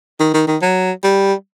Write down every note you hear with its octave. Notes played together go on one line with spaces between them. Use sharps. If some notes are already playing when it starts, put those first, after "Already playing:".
D#3
D#3
D#3
F#3
G3